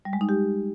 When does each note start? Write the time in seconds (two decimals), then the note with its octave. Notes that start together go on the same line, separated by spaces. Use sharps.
0.05 G3
0.13 G#3
0.21 D#4
0.29 G4